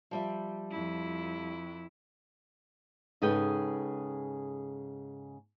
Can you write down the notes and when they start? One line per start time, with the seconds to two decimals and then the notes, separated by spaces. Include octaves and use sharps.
0.11 F3 G3 E5
0.71 F2 E4
3.22 G#2 C#3 G#4 A4 B4 G5